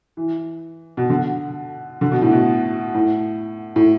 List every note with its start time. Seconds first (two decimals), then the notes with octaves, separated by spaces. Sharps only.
0.17 E3
0.97 B2
1.10 D3
2.01 D3
2.12 B2
2.22 A2
2.32 B2
2.94 A2
3.76 A2